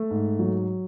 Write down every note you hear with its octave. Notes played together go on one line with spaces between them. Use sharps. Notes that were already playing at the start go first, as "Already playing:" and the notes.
Already playing: A3
G#2
F#3